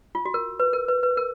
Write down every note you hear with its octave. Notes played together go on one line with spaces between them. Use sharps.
F4
F#4
A#4
B4
A#4
B4
B4
A#4